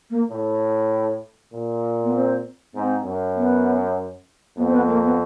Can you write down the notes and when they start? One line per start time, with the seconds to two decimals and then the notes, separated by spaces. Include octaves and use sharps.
0.10 A#3
0.30 A2
1.53 A#2
2.03 B3
2.13 C4
2.74 G#2 C4
3.04 F#2
3.35 B3
4.57 F2 B3
4.66 C4
4.73 B3
4.87 A#3
5.02 B3